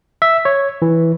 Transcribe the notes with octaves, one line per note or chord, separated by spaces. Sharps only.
E5
C#5
E3